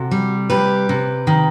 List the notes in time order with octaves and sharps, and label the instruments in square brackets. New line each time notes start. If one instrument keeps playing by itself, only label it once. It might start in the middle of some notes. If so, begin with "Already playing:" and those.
Already playing: [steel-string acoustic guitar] C3 F#4 A4
G3
C3 G4 B4
C3
D#3